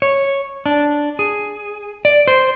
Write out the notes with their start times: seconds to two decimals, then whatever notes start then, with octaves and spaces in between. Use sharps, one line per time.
0.02 C#5
0.66 D4
1.19 G#4
2.05 D5
2.28 C5